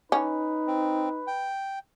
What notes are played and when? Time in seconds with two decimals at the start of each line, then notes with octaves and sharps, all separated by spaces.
0.12 C#4 D#4 B4
0.67 C4
1.27 G5